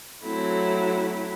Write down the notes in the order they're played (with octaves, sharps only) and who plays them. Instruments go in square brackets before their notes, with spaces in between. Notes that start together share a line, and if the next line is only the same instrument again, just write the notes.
[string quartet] F#3 A3 C4 E4